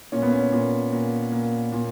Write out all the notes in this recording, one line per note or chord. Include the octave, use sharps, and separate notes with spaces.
A#2 C#4
B3
C#4
A#2
A#2
A#2
A#2